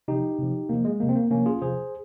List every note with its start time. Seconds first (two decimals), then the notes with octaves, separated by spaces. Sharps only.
0.08 C3 F3 D#4 G4
0.39 C3 F3
0.69 C3 F3 A#3
0.85 G#3
1.00 C3 F3 A#3
1.09 C4
1.15 A#3
1.31 C3 F3 A#3 C#4
1.46 F4 G#4
1.62 C3 F3 G#4 C5